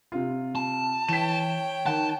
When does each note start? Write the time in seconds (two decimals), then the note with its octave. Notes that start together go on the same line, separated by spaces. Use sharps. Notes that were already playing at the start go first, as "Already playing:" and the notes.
0.12 C3 F4
0.56 A5
1.09 E3 C#5 G5 B6 E7
1.86 D#3 F#5 A5